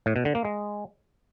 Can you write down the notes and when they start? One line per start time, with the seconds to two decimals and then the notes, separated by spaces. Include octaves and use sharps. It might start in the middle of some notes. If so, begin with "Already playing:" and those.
0.06 A2
0.16 B2
0.25 D3
0.35 A#3
0.45 G#3